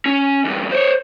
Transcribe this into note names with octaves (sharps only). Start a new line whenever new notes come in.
C#4
E2 G2
C5 C#5